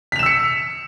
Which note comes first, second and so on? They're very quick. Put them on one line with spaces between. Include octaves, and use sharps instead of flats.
B6 F7 E7 E6 C#7